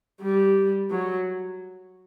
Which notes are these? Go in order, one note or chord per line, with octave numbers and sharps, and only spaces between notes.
G3
F#3